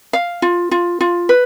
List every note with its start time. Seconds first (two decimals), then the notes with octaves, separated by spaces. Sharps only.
0.13 F5
0.42 F4
0.71 F4
1.01 F4
1.29 B4